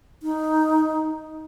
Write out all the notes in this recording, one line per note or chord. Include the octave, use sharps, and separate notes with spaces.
D#4